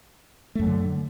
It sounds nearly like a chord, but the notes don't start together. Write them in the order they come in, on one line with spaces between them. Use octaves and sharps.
A3 F#2 F#3 D3